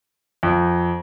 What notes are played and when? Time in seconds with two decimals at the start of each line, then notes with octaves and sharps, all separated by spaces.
0.43 F2